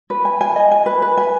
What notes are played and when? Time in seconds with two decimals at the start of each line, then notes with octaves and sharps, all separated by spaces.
0.10 B4
0.25 G#5
0.41 G#5
0.56 D#5
0.71 G#5
0.86 B4
1.02 B4
1.17 G#5